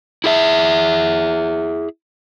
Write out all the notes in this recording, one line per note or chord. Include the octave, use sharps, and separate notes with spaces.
E4 G#4 E5